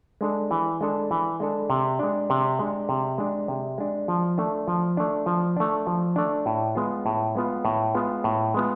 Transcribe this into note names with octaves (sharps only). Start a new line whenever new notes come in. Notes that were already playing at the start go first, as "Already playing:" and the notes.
G#3 D4 A4
E3
G#3 D4 A4
E3
G#3 D4 A4
C3
G#3 D4
C3
G#3 D4
C3
G#3 D4
C3
G#3 D4
F3
A3 D4
F3
A3 D4
F3
A3 D4
F3
A3 D4
A2
G#3 B3 F4
A2
G#3 B3 F4
A2
G#3 B3 F4
A2
G#3 B3 F4